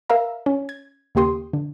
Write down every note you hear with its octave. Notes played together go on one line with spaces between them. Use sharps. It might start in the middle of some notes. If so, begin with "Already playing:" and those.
A#4 E5 F5 A#5
C#4
G#6
D#2 C#3 A#3 G4 C6 D#6
D3